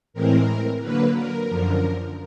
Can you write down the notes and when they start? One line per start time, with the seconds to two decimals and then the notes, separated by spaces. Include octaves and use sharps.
0.13 A2 E3 G#3 C4 A#4
0.81 D3 F#3 A#3 B4
1.14 A#4
1.48 F#2 D3 F3